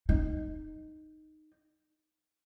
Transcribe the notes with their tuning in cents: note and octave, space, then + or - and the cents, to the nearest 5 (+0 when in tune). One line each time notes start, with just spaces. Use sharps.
D#4 -5